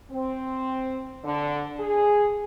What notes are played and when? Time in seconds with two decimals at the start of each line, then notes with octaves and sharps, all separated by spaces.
0.11 C4
1.25 D3
1.79 G#4